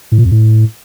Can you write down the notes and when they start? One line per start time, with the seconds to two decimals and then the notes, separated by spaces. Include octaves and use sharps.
0.12 A2
0.18 A#2
0.25 F2
0.32 A2